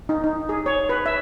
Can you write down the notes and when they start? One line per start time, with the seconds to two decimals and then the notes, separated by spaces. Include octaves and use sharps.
0.09 D#4
0.24 D#4
0.49 G#4
0.66 C#5
0.89 B4
1.06 E5